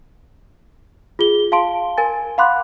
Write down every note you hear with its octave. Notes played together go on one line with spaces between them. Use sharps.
F4 G#4 G7
F5 A5 C6 D7
A#4 G#5 A6
F5 F#5 B5 C6 D6 F#6